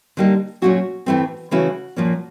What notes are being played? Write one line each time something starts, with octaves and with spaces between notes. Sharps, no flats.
D3 G3 A#3 D#4
A#2 F#3 A3 C#4 F#4
A2 E3 A3 C4
C#3 E3 A3 C#4 E4 F#4
A#2 F3 A#3 C#4